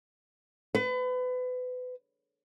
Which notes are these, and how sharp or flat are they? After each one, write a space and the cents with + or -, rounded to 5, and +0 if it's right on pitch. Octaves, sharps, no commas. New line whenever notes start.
B4 +30